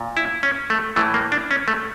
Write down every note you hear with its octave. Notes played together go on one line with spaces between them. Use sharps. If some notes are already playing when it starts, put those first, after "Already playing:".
Already playing: A#2
E4
C#4
A3
A2 E3 A3
A#3
D4
C#4
A3